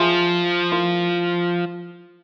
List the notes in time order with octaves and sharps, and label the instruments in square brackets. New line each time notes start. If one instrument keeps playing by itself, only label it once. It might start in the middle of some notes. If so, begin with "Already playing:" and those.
Already playing: [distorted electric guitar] F3 [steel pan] F4 G#4 E5 G#5
[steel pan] E4 A#4 F5 C6